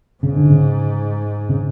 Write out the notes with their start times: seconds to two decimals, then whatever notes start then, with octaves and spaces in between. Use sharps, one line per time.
0.23 G#2 C#3
0.36 D3
0.50 C#3
1.49 C#3